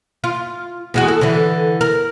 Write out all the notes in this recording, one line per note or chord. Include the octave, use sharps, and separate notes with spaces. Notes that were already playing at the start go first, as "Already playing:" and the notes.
F4
E2 G#3 F#4
A4
D3 E3
A#4